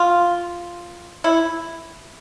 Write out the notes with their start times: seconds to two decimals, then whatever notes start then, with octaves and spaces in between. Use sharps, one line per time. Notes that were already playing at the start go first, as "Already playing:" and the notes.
Already playing: F4
1.24 E4